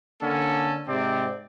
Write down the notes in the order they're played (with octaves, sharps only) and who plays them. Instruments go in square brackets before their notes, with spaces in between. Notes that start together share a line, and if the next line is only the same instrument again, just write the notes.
[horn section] D3 A#3 C#4 A4
G#2 C3 C4 D5